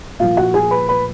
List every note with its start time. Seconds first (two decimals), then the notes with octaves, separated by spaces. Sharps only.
0.20 A#2 F3 F4 F5
0.37 F#4 F#5
0.54 G#4 G#5
0.71 B4 B5
0.89 B4 B5